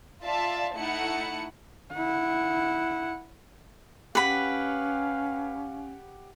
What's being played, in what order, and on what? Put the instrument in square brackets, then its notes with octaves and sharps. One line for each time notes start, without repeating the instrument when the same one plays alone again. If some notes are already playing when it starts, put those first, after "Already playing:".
[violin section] F4 D5 E5 F5 A5
A3 D#4 E4 F#5 C#7
[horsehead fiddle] E4 F#5
[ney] C#4 [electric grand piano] G4 F#5 [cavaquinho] B4 B5 [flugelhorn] F5